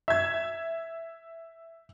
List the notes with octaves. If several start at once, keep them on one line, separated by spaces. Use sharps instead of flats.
E5 G#6